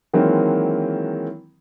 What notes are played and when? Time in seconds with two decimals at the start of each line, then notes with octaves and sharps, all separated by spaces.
0.13 D#3 E3 F#3 G#3 A#3 C4